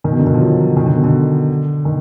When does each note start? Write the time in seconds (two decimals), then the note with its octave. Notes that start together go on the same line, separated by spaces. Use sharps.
0.04 D#3
0.12 B2
0.19 D3
0.27 D#3
0.34 F3
0.41 F#3
0.77 D#3
0.86 D3
0.95 B2
1.04 D3
1.85 D#3